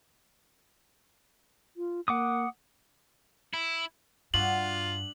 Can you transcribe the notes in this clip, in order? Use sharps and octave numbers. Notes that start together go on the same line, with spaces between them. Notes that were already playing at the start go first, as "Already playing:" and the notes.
F4
A#3 F#5 D6 D#6
E4
G2 D4 F4 F#4 E5 F#7